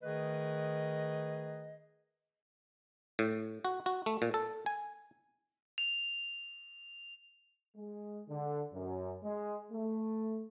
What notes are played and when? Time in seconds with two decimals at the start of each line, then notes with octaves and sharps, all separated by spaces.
0.02 D#3 A3 G#4 B4 D#5
3.19 A2
3.65 F#4
3.86 F#4
4.06 A3
4.22 A#2
4.34 A4
4.66 G#5
5.78 F7
7.77 G#3
8.29 D3
8.73 F#2
9.23 G#3
9.72 A3